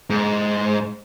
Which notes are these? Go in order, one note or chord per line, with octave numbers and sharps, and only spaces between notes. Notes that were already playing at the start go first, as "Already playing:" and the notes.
G#2